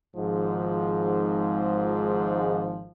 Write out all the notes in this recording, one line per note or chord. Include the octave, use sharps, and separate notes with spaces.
G#1 G#2 F3